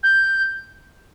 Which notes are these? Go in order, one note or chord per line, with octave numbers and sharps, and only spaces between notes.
G6